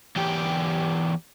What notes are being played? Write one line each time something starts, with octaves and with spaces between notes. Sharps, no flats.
E2 G4